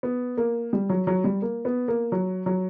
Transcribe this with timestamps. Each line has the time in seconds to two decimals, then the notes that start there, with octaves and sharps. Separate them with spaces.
0.03 B3
0.37 A#3
0.73 G3
0.89 F#3
1.07 F#3
1.24 G3
1.42 A#3
1.65 B3
1.88 A#3
2.12 F#3
2.46 F#3